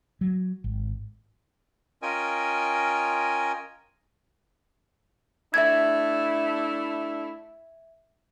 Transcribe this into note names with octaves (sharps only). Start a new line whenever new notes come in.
F#3
G#1
C#4 F4 A#4 D#5 G5 G#5
A3 D4 E4 E5 G#6